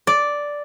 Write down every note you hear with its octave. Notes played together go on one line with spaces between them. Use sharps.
D5